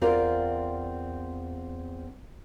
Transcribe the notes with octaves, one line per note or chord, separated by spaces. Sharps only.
E2 C4 F4 A#4 D5